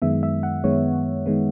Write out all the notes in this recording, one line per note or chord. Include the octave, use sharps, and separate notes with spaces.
F#2 D#3 G#3 B3 E5
E5
F#5
F#2 D#3 G#3 B3 C#5
D#3 G#3 B3